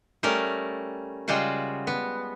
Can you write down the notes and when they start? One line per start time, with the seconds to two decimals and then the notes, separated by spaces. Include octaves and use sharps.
0.23 G3 A3 C#4 A#4
1.28 C#3 G3 G#3 F4 F#4
1.87 B3